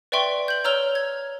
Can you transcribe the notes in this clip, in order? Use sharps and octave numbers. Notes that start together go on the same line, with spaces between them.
B4 D5 E5 G5 C6 C#6
G6 F#7
C#5 A#5 E6 F6 F7 G7
G#6